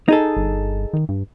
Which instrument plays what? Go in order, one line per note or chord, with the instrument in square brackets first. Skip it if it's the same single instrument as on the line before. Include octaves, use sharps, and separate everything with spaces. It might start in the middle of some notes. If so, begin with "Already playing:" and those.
[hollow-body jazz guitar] D#4 G#4 A4
[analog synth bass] G1
D#3
G2